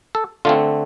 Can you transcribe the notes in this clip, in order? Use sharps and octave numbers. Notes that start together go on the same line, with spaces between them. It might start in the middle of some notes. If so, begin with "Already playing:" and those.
A4
D3 A3 C4 F4